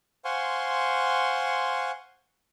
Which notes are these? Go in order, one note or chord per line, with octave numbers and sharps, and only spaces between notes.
C5 F5 F#5 G#5 C6 C#6